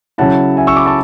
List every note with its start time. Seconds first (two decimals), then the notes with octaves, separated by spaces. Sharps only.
0.18 C#3 F#3 C#4 E4 F#5 A5
0.57 E5 G#5
0.67 C#6 E6
0.76 B5 D6
0.86 A5 C#6